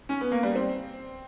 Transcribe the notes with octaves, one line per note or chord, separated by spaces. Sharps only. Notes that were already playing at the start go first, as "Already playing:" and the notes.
C#4
B3
A#3
G3
C4